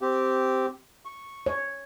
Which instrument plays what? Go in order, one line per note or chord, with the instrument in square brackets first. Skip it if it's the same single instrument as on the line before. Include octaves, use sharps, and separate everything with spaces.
[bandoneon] C4 G4
C#6
[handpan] C#5